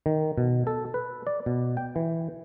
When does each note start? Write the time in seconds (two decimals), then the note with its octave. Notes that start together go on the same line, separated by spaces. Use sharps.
0.06 D#3
0.38 B2
0.67 A4
0.94 B4
1.27 D5
1.46 B2
1.77 G5
1.96 E3